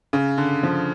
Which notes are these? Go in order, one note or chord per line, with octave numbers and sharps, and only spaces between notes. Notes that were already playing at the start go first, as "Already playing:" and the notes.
C#3
D3
F3